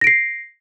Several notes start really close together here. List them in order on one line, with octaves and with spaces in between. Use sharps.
A#6 D7 C7